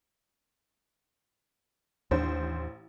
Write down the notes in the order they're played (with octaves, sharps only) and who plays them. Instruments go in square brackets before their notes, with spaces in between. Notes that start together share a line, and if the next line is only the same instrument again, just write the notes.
[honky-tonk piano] A1 C5 [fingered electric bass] D#2 D4